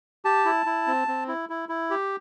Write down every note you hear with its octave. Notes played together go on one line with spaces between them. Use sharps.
G4 A5
E4
E4
C4
C4
E4
E4
E4
G4